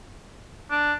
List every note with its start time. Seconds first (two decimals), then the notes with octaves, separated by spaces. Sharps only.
0.71 D4